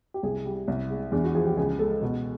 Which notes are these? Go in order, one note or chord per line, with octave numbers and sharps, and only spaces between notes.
G4
C2 G#4
G3
C2
G#3
E2 D4
F#4
F3 G#4
G4
C#2 G#4
G#3 A4
B2